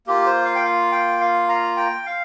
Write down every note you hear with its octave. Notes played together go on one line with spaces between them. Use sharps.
A#3 F4 G4
C5
F5
G5
F5
G5
F5
A#5
G5
F5